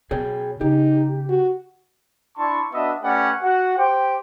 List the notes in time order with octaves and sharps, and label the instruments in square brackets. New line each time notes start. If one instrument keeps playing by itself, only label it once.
[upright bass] B2 [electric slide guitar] G#4 C#5 G5
[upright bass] C#3 [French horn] D#4 [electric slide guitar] G4
[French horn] F#4
[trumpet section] D4 E4 A5 C6 C#6
B3 D4 F#4 D#5 E5
A3 C#4 G4 B4 D5 F#5
F#4 F#5
G4 C5 G5